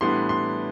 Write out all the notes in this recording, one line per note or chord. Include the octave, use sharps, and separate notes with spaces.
A2 E3 G3 B3 D4 C6
C6